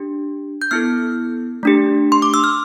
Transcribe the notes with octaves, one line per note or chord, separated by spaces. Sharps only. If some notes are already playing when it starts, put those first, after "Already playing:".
Already playing: D4 G4
G6
B3 E4 A4 F6
A3 D4 G4
C6
D6
E6
F6